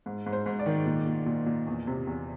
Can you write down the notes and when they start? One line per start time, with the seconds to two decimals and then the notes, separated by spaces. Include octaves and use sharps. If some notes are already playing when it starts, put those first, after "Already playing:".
0.06 G#2
0.26 G#2
0.33 C5
0.46 G#2
0.59 D5
0.66 D#3
0.86 A#2
1.07 A#2
1.26 A#2
1.46 A#2
1.67 E2
1.87 C3
2.07 E2